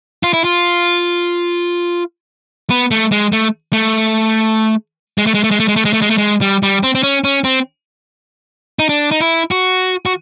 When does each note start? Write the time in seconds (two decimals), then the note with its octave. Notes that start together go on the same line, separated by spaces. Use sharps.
0.23 F4
0.33 E4
0.44 F4
2.70 B3
2.91 A3
3.12 G#3
3.32 A3
3.73 A3
5.18 G#3
5.26 A3
5.34 G#3
5.44 A3
5.51 G#3
5.60 A3
5.68 G#3
5.76 A3
5.85 G#3
5.93 A3
6.02 G#3
6.10 A3
6.18 G#3
6.41 G3
6.63 G3
6.83 C4
6.95 C4
7.03 C#4
7.24 C#4
7.44 C4
8.79 D#4
8.89 D4
9.11 D#4
9.20 E4
9.51 F#4
10.06 F#4